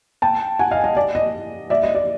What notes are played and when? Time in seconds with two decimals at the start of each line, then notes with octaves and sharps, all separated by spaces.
0.22 G5 A5
0.59 F#5 G#5
0.71 D#5 F5
0.84 D#5
0.97 D5
1.15 D#5
1.70 D5 E5
1.83 D#5
1.95 D5